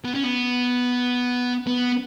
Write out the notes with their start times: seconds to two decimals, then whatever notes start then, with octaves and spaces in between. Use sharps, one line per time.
0.05 B3
0.15 C#4
0.24 B3
1.67 B3